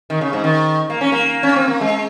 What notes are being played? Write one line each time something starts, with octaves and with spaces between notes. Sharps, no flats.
D#3
C#3
G#2
D#3
A#3
C#4
A#3
C#4
C4
A#3
G#3